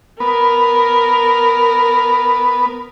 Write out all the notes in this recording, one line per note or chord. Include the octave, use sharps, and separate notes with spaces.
B3 A#4